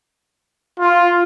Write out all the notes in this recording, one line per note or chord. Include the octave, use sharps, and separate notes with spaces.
F4